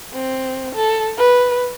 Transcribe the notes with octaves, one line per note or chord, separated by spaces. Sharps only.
C4
A4
B4